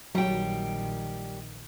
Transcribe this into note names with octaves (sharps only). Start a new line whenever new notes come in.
A#1 D#3 F#3 G3 G5